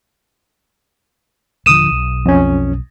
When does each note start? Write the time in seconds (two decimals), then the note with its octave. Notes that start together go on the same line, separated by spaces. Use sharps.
1.66 D#1 D3 F3 D#6 D#7 E7
1.91 B1
2.26 F2 C#4